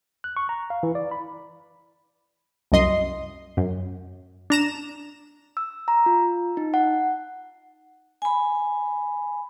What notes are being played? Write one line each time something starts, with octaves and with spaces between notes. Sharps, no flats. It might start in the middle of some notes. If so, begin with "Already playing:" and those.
F#6
C#6
A#5
F5
E3
D5
B5
C2 F#2 D#5 C6
F#2
D4 A#5 E7
E6
A#5
F4
D#4
F#5
G#5 B5